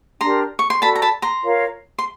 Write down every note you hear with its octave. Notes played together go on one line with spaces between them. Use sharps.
D4 G4 A#4 A#5 C6
C#6
C6
F#4 A4 D5 A5 B5
A#5
A5 B5
A#5 C6
F4 A#4 C#5 F5
C6